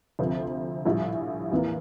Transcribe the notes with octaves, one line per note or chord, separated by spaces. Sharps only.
D2 C3 F3 C4
A#1 A2 G3
E2 E3 A#3